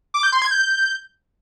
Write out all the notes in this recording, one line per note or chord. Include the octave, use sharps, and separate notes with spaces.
D6
G6
C6
G#6
G6